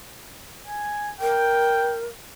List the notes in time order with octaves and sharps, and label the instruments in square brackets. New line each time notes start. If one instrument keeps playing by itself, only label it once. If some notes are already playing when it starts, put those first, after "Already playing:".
[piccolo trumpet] G#5
[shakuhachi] A#4 [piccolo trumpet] G5